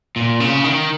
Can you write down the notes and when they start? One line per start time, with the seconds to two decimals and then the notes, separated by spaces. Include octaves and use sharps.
0.16 A#2
0.40 C#3
0.64 D#3